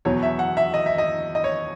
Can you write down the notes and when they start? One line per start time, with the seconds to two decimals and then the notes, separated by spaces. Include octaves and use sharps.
0.05 E2 B2 F#3 C#5
0.23 E5
0.39 F#5
0.57 E5
0.74 D#5
0.86 E5
0.98 D#5
1.35 D#5
1.44 C#5